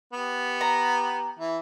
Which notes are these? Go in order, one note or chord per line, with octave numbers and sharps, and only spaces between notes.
B3 G4
A#5
E3 E5